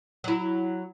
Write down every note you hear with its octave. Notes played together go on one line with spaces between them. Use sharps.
F#3 E4